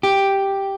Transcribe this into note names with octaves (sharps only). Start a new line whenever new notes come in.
G4